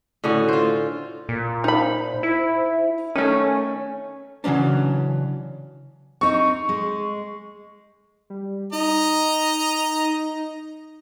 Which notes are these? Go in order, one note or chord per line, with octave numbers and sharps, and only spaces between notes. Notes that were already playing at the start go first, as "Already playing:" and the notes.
A2 D3 C#4 F#4
F4 C5
A#2
D#4 C5 B5
E4
D#3 A3 C#4 C#5
C#3 E3 F#3 C#4 D4
C4 D#4 C#6
G#3
G3
D#4 D#5 A#5